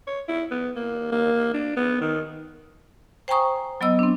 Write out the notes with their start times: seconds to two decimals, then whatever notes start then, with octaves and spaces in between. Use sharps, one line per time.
0.07 C#5
0.28 E4
0.51 B3
0.76 A#3
1.12 A#3
1.53 D4
1.77 B3
2.01 D#3
3.28 C5 G5 G#5 A#5 C#6 D#6
3.81 F#3 B3 D#5 E6
3.99 C4 D4